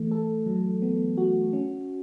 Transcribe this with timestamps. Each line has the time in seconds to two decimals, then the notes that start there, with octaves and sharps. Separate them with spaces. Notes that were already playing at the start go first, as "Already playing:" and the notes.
Already playing: E3 A3
0.11 A4
0.46 F#3
0.82 B3
1.17 F#4
1.53 C#4